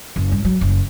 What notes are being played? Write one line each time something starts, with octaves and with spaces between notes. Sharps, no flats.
F#1
G2
F#3
F#1